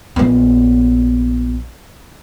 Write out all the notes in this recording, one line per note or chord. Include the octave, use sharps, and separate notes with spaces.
A#1 B3